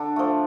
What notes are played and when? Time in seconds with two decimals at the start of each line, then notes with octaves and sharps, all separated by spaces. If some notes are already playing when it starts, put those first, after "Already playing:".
Already playing: D3 D4
0.16 F3 A3